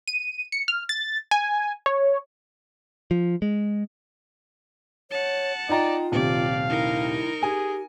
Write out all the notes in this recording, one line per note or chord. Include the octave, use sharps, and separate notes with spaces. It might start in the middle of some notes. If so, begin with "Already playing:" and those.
D#7
C#7
F6
A6
G#5
C#5
F3
G#3
C#5 F#5 A5
D#4 F4 D5 G5 A#5
D#1 C3 D5 F5
D#4 E4 A#4
G4 G#4 G#5